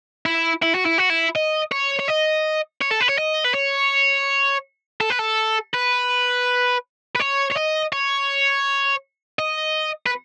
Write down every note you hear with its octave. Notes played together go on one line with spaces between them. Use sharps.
E4
E4
F#4
E4
F#4
E4
D#5
C#5
C#5
D#5
C#5
A4
B4
C#5
D#5
B4
C#5
A4
B4
A4
B4
B4
C#5
C#5
D#5
C#5
D#5
B4